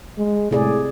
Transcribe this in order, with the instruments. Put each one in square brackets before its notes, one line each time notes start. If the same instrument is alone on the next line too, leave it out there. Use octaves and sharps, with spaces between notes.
[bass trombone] G#3
[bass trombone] A2 [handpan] C3 G#4 D5